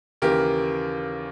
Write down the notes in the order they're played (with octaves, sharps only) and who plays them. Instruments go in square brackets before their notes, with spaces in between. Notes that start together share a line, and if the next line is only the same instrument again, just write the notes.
[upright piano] D#2 C#3 E3 G4 A#4